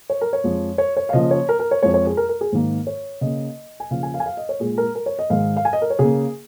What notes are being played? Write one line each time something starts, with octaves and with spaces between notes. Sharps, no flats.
C#5
A#4
C#5
F2 F3 G#3
C#5
C#5
F5
C#3 F3 A#3 D#5
C#5
A#4
A#4
C#5
F2 F3 G#3 C#5
C#5
G#4
A#4
A#4
G#4
G#2 D#3 A#3
C#5
C#3 A#3 D#5
G#5
C#3 F3 A#3 F5
G#5
F5
G#5
F5
D#5
C#5
A#2 G#3 G#4
A#4
A#4
C#5
D#5
G#2 D#3 G#3 F5
F5
G#5
D#5
A#4
C#5
C#3 A#3 G#4